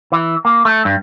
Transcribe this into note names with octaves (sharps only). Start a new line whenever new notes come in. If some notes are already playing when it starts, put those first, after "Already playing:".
E3
A#3
A3
G2